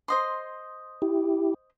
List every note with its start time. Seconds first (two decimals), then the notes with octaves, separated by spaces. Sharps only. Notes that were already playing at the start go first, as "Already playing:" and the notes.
0.08 C5 D#5 C6
1.02 E4 G4